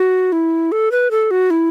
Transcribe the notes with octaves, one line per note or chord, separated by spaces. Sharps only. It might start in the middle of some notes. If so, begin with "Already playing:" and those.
Already playing: F#4
E4
A4
B4
A4
F#4
E4